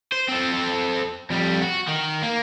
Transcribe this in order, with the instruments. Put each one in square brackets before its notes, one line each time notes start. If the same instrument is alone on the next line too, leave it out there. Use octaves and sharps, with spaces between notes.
[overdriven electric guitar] C5
C4 A4
F2 G3
F#4
D#3
A#3